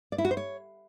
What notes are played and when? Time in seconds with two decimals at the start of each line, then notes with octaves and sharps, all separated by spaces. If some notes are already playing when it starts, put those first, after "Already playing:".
0.12 D5
0.18 E4
0.25 F#4
0.31 C5
0.37 C#5